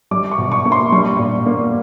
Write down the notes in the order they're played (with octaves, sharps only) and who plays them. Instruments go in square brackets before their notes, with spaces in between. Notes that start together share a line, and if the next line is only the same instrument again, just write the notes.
[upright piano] G3 D6
C#6
B2
C#6
A#3
C6
G3 C#6
A#2
A#3